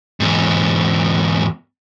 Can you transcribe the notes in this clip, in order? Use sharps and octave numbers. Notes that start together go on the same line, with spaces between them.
E2 G#2